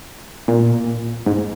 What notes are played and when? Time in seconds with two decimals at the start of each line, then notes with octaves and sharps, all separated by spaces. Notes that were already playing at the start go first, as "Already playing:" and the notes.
0.48 A#2
1.26 G#2